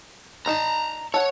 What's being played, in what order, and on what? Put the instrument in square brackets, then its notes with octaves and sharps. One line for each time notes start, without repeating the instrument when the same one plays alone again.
[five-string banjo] D4 D#4 [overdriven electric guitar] A5 A#5
[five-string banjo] A4 F#5 [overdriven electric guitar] C#5